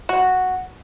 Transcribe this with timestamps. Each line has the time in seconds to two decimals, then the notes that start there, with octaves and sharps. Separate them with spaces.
0.09 F#4